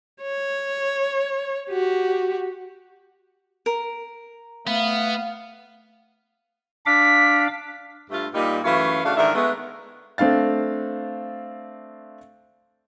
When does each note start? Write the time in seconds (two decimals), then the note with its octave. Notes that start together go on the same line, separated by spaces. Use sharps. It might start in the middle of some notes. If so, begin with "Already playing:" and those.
0.22 C#5
1.70 F#4 G4
3.66 A#4
4.67 A3 B3 F5
6.86 D4 F5 D6 B6
8.11 G2 A3 F4
8.34 A#2 G3 D#4
8.64 F#2 E3 A3 C#5 F5
9.04 C#3 A3 D4 F#4 F5
9.16 G#2 D#3 D4 E4 A#4 E5
9.35 G#3 A3 B3
10.18 A3 C4 D4 F5 A6